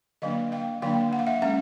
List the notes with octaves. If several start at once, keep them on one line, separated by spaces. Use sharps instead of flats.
D3 F#3 A#3 D4 D#5 F5
F5 G5
D3 F#3 A#3 D4 F5 G5
F#5
F5
E5 F#5
G#3 C#4 E5 F#5